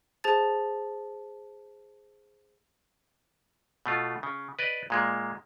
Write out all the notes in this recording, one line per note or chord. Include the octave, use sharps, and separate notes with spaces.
G#4 C5 A5 A6
B2 A3 F4
C#3
B4 D5 D#5
A#2 G#3 A#3